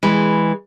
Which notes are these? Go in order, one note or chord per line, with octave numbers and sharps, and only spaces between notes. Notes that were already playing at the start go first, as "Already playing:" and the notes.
E3 G#3